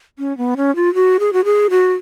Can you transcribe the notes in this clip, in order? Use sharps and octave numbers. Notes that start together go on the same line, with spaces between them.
C#4
B3
C#4
F4
F#4
G#4
F#4
G#4
F#4